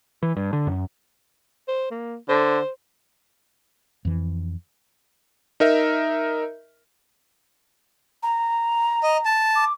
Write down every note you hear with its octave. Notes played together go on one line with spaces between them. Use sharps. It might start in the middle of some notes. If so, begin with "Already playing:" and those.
E3
G2
D3
F#2
C5
A#3
D3 C5
F2 E3
D#4 A#4 E5
A#5
D#5
A5
D6